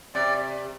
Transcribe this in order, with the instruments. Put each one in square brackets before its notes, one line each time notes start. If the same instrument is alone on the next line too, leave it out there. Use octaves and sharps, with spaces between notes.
[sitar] C3 [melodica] D5